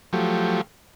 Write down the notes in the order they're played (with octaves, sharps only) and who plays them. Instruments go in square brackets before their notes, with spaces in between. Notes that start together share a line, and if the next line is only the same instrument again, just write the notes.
[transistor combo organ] F3 F#3 A3 G4